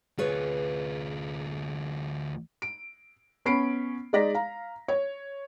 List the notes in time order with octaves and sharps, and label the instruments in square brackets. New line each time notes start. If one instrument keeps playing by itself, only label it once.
[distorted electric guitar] D2 F4 [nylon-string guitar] G#4 B4 C#5
[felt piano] D7
B3 C#4 B5 C7 D7
G#3 D#4 D5 A#6 B6
F5 A#5
C#5